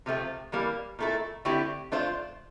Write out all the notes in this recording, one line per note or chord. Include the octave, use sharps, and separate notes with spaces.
C3 F3 A3 C4
E3 G3 A#3
A#2 A3 E4 A4
D3 A3 C4 E4 G4
A3 D4 F4 C5